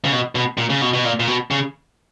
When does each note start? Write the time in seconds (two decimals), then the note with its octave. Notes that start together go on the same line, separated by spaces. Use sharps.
0.05 C#3
0.12 B2
0.35 B2
0.58 A#2
0.70 C#3
0.81 B2
0.93 B2
1.04 A#2
1.20 A#2
1.27 B2
1.51 C#3